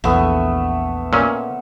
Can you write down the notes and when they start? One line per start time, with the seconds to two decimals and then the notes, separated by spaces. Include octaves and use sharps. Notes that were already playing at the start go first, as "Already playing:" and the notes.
0.04 A#1 E2 A3 B3 E5
1.13 A#2 C#4